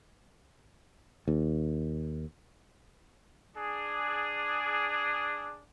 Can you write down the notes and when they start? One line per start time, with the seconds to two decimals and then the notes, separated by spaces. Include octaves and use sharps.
1.28 D#2
3.57 D4 G#4